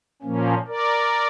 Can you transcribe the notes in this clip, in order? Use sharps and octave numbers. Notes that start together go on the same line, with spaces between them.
A#2 F3 A#3 C#4
A#4 D5